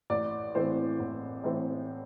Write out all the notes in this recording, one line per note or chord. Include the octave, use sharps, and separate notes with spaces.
A1 D5
A2 E3 C4 C5
A1
A2 E3 C4